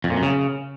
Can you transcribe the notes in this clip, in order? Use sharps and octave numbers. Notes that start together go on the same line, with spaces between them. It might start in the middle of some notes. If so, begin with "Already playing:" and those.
F2
A#2
F#2
C#3